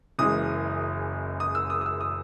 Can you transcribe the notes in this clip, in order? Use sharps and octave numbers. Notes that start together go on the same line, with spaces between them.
F#1 F#2 E3 G#3 D#6
D#6
E6
D#6
D#6
E6
D#6